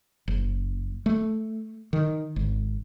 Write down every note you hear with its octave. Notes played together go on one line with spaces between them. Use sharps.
F#1
A3
D#3
G#1